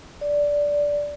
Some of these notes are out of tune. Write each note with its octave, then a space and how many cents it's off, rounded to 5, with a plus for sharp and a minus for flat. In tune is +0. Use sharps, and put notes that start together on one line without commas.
D5 -10